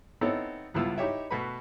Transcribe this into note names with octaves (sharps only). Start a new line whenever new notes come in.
B3 C4 D#4 E4 A4 C#5
C#2 G2 B3 E4 F4 E6
D#4 E4 G4 C#5 E5
B2 A3 F#4 B4 B5